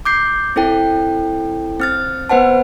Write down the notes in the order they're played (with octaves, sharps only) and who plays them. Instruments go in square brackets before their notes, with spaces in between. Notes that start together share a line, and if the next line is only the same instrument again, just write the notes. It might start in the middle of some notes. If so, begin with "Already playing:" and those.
[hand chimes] D6 G6 C7
C4 E4 A4 G5
C4 F6 A6
B3 B4 C5 F#5 A5